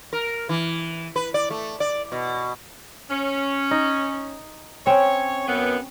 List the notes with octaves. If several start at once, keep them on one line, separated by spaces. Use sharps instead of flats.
A#4
E3
B4
D5
A3
D5
B2
C#4
D#4
C4 C#4 C#5
F#2 B3